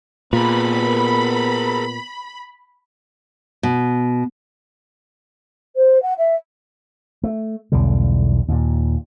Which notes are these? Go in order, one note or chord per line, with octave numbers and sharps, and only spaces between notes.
A#2 B3 G#4 A#4 B4 B5
B2
C5
F#5
E5
A3
B1 E2 D3 G3
D#2 A#2